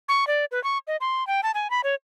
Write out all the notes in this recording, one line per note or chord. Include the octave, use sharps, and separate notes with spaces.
C#6
D5
B4
C#6
D#5
C6
G5
A5
G#5
B5
C#5